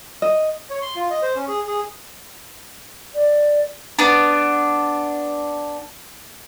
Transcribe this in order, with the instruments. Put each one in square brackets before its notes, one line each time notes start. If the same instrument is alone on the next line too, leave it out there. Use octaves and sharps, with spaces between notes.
[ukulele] D#5
[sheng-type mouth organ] C#5
C6
F4
D#5
C5
C#4
G#4
G#4
[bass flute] D5
[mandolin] B3 D4